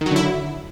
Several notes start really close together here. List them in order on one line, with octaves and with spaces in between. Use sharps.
D#3 F#3 D3 E4